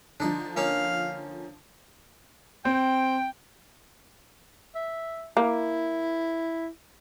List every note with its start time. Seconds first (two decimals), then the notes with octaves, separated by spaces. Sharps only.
0.20 D3 F3 D4 D#4
0.57 A#3 C#4 D#4 F5
2.65 C4 G5
4.75 E5
5.37 A#3 E4